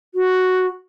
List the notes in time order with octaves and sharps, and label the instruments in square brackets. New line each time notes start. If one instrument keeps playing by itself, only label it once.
[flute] F#4